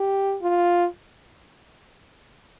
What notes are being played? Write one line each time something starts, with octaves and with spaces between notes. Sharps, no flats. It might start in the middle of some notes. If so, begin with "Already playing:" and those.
Already playing: G4
F4